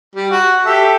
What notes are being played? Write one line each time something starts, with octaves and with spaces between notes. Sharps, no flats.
G3
F#4
G4 A4 E5